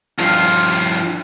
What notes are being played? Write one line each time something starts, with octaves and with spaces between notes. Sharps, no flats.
G2 F3